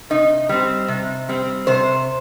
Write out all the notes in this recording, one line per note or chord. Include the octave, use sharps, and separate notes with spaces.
C3 D#4
G3 C4
C3
G3 C4
C3 C5